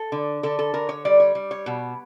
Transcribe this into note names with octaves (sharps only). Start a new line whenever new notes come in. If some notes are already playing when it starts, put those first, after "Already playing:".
Already playing: A4
D3
D3 A4
A4
D3 A#4
C#5
G3 D5
C#5
G3
C#5
B2